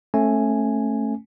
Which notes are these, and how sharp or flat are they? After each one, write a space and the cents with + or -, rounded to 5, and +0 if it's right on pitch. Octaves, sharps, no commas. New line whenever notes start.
A3 +0 C#4 -30 G#5 +0